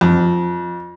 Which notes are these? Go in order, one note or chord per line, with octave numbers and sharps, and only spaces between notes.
F2